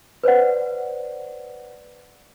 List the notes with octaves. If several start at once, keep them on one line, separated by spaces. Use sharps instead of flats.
B4 C5 D5 F#5